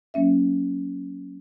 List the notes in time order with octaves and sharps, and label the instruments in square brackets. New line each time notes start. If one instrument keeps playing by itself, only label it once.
[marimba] F#3 A#3 C#4 E5